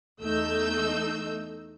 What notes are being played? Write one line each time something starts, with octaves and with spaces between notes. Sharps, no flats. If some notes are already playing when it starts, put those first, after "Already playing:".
E2 A3 D#4 E6 G6